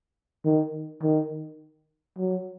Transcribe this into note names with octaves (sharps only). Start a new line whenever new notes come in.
D#3
D#3
F#3